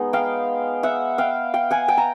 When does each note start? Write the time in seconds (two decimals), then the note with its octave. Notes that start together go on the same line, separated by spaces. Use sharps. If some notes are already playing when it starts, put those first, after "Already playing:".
Already playing: G#3 B3 D#4
0.13 F5 G5
0.83 E5 F#5
1.18 F5 G5
1.54 F5 G5
1.71 F#5 G#5
1.88 G5 A5
1.97 A#5